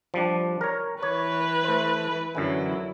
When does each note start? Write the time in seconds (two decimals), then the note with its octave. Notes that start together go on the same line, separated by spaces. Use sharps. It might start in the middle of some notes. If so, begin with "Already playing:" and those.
0.14 F3 G3 D4
0.61 A#4 C#5
1.03 E3 B4 C#5
1.64 A3 C5
2.35 F#2 D3 E3 F#3 E4